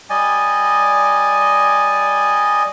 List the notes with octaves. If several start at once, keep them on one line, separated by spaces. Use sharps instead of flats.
G3 D5 D#5 G#5